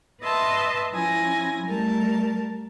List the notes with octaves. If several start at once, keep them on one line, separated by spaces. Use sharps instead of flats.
B4 D#5 E5 A5 C6
F3 C#4 E4 G#5 A#6
G3 A3 A#4 A5